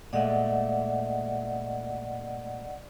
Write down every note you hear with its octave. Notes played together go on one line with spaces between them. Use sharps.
A#2 G#3 A3 D5 D#5 F#5